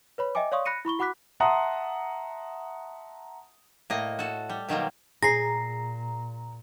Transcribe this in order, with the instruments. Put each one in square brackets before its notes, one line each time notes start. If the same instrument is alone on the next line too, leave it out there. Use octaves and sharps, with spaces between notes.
[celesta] B4 C#5 B5
D#5 E5 G5 G#5 D6
C#5 D5 F5 C6 C#6 D#6
B5 F#6 A#6 C#7 D#7
E4 B5 C#6 G7
F#4 F#5 B5 D6 F#6 B6
[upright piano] E5 F#5 A5 A#5 C6 D#6
[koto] A2 A#3 D#5
F#4 A4
G3
B2 D#3 F#3 G3 A#3
[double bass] A#2 [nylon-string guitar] G#4 [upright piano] A#5 [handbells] A#6 C7